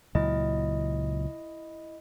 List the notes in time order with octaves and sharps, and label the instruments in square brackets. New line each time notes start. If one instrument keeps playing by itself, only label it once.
[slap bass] C#2 A#2 F#3 [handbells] E4 D#5